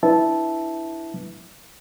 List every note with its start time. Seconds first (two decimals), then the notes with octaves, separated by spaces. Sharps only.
0.03 D4 E4 B4 E5 A5